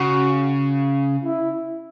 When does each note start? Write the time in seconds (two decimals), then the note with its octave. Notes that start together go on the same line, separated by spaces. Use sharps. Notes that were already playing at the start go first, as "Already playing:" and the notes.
Already playing: C#3 F#4
1.24 E4